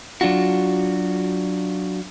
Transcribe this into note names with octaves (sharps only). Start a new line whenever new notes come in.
F#3 D4 F4 F#4